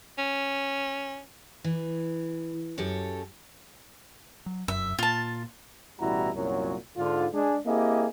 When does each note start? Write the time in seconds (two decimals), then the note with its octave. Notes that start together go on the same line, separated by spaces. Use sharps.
0.18 C#4
1.64 E3
2.78 F#2 G4 A4 C#5
4.46 F#3
4.68 F1 F#2 E5
4.99 A#2 F4 A5
6.00 A1 B2 G3 E4 F#4 A#5
6.35 C2 F#2 A#2 F#3
6.97 G#2 D3 F4
7.33 G#3 D4 G#4
7.66 A#3 C4 E4 G4 G#4 D#5